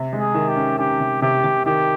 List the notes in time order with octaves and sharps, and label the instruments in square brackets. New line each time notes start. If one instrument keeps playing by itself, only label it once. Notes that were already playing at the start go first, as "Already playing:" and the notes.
Already playing: [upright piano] C3
G#3
[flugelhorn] G#4
[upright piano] D#3
[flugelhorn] G4
[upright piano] C#4
[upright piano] C#4 [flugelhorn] G4
[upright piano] C3
[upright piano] C3 [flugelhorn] G4
[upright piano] C3
[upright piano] D#3 [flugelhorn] G4